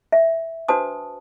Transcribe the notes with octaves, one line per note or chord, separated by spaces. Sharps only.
E5
D4 F#4 B4 C5 A5 D#6